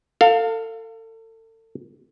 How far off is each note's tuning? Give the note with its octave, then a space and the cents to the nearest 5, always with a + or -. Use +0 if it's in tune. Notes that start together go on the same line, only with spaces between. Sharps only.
A4 +35 F5 +5